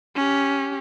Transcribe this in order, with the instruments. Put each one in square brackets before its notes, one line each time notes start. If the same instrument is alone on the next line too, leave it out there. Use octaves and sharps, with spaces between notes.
[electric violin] C#4 G4